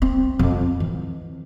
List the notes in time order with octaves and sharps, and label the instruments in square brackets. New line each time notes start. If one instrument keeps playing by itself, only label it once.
[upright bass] C4
F2
E3